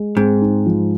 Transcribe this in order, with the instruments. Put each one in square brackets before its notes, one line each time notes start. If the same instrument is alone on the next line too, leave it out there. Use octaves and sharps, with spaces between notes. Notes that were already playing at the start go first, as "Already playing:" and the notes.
Already playing: [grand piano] G#3
[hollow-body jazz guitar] G#2 [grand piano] C4
[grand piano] D#4
F3